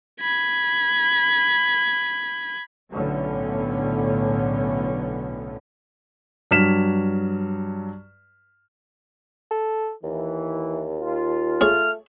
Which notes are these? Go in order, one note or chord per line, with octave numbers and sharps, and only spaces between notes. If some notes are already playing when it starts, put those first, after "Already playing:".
B5 G#6
B1 A2 D3 B3 C#4
G2 F#3 F6 B6 E7
A4
D#2 E3
F4
A3 G#4 C#5 F6